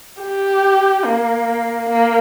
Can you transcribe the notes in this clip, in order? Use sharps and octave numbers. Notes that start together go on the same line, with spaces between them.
G4
A#3
A#3